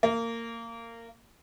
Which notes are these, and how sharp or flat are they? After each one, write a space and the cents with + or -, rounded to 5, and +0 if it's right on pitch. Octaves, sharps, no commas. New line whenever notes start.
A#3 -20